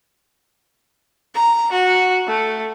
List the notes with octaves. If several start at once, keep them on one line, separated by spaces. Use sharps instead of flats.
A#5
F#4
A3